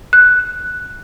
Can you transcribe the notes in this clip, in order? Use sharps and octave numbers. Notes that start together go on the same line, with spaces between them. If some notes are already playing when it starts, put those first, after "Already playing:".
F#6